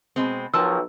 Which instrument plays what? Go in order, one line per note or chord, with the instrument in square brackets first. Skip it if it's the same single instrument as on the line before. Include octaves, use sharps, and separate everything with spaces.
[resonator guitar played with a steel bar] B2 G#3 C4
[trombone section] B1 [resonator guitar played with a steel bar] F3 A#4 A5 [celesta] E6